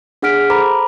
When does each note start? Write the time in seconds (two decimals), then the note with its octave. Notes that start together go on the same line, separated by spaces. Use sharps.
0.22 D4 G#4 F#5 F6 B6 D7
0.50 A4 C5 A#5 B5 D6